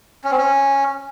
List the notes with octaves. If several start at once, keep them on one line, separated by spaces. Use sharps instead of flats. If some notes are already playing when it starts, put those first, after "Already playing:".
C#4
C4
C#4